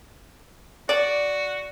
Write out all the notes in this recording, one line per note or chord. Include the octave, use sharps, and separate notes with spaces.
F#4 D5